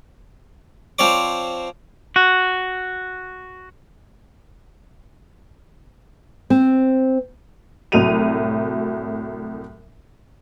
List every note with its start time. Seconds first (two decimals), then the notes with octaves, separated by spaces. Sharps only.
0.99 F3 C4 C#5 D5 D6
2.16 F#4
6.50 C4
7.92 C2 A2 F#3 D#7 F7